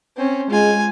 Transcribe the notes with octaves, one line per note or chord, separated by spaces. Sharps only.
C4 C#4
G#3 F4 G#5